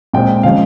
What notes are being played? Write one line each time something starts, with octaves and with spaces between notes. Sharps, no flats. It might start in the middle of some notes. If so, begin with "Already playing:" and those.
A#2 G#3 C4 G5
C#3 F3 G#3 F5